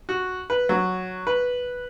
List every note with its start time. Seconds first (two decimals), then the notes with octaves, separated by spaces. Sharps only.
0.09 F#4
0.50 B4
0.69 F#3
1.27 B4